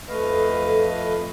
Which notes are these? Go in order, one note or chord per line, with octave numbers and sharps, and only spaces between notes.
F2 A3 B4 D#5 F5